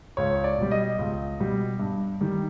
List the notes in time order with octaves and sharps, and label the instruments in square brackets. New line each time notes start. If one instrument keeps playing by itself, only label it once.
[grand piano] C#2 C#5
D5
B2 G3
D#5
C#2
B2 G3
G2
D#3 G3